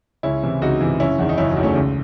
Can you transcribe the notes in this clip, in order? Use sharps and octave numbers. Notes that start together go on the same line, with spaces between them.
C#2 C#4 E4
C3 E3
C#2 D#4 F#4
C3 E3
F#1 C#4 E4
E2 D#3
D#4
F#1 C#4 E4
F#3
E2 D#3
A3 C#4
C#2